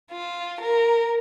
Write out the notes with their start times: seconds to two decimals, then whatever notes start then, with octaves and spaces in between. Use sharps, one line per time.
0.11 F4
0.61 A#4